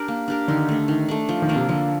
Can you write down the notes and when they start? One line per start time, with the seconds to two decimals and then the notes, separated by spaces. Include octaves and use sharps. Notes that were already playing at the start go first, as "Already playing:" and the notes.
Already playing: D4 G4 A#4
0.08 A#3
0.28 D4 G4 A#4
0.48 D3 D#3
0.69 A3 D4
0.88 D#3
1.08 A3 D4
1.29 F3
1.42 D#3
1.49 A#3 D4
1.56 C3
1.69 D3 F3